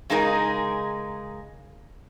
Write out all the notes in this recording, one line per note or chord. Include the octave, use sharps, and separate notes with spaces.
C#3 G#3 D#4 G#4 A#4